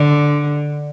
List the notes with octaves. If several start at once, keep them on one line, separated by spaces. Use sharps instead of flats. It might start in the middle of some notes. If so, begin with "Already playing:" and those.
Already playing: D3